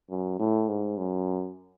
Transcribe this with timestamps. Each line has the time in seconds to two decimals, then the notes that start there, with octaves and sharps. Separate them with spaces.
0.10 F#2
0.39 A2
0.68 G#2
0.97 F#2